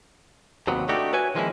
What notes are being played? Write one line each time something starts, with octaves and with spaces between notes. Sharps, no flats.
D#2 C3 F#3 B3
A3 D4 D#4 F#4 G4
F#4 B4 C#5 E5 G#5
D#3 F3 G#3 A#3 C#4 E4